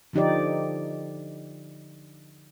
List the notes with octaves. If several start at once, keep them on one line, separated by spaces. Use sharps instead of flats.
D3 F3 D#4 G4 D5